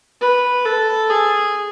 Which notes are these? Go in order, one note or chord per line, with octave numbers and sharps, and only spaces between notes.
B4
A4
G#4